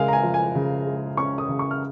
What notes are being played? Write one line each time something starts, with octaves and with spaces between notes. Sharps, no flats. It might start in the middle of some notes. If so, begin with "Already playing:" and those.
Already playing: C#3 G#3 A#4 F5 G#5
A#5
G#5
F3
G#5
C#3
G#3
C#4 C#6
D#6
C#3
C#6
F6